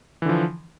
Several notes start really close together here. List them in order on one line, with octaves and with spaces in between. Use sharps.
E3 D3 F3